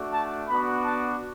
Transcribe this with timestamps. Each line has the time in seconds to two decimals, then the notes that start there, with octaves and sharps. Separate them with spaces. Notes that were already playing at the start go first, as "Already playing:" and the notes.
Already playing: A3 D4 F#4
0.12 A5
0.48 B3 D4 F#4 B5
0.84 A5